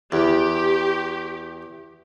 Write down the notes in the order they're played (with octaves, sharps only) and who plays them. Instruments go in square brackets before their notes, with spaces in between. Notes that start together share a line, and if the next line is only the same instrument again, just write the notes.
[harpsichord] E2 [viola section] G4